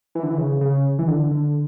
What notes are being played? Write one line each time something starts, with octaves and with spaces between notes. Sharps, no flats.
E3
D3
E3
C#3
C#3
E3
D3
D3